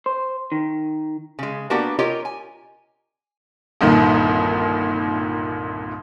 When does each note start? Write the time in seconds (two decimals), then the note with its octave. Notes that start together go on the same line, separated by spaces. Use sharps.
0.06 C5
0.52 D#3
1.39 C#3 G#3
1.70 A#3 B3 D4 F#4 G4 A#4
1.99 F4 G4 A#4 C#5 D#5
2.25 G#5
3.81 G1 C2 A#2 D#3